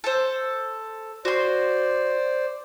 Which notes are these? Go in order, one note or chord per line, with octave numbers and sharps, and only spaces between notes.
A4 C5
F#4 C5 D5 C6